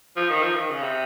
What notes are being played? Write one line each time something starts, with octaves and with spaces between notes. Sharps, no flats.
F3
D#3
F3
D#3
C#3
C3